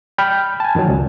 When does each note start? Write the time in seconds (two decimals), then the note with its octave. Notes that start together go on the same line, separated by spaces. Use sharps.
0.18 G5 B5 F6 G6
0.60 G#5 A5
0.75 F#2 D#3 E3 F#3
0.88 C#2